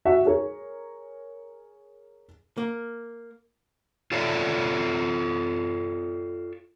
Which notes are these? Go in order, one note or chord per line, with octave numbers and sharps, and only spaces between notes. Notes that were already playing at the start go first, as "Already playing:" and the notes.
F#4 E5 F#5
G#4 A#4 C#5
A#3
F4 A4 C#5 D5 E5